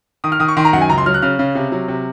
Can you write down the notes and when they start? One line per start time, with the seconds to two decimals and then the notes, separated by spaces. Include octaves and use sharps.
0.24 D#3 D#6
0.32 F6
0.40 D#3 D#6
0.48 C#6
0.57 D#3 C6
0.65 A#5
0.73 F#2 F#5
0.81 G#5
0.89 C#2 A#5
0.98 C6
1.06 F#3 F6
1.14 F#6
1.22 C#3 F6
1.39 C#3
1.55 C3
1.72 F#3
1.88 C3